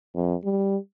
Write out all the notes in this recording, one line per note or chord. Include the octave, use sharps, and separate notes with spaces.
F2
G3